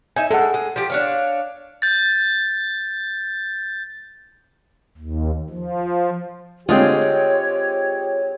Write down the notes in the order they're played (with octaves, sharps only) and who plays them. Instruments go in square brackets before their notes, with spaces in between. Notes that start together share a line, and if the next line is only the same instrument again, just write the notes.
[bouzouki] D#4 E5 [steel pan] G#5
[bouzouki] G#3 [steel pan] A4 F#5
[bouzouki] G#4
F3 G4
D4 C#5 F5
[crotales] G6 A6
[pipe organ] D#2
F3
[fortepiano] D3 G#3 C4 [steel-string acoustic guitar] F4 G#4 G5 [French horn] G4 [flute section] C#5